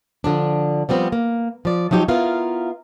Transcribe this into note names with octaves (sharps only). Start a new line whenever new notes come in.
D3 F3 D4
F3 G3 B3 C4
A#3
F3 D5
F3 F#3 D#4 G4 C#5
B3 E4 F4 A#4 F5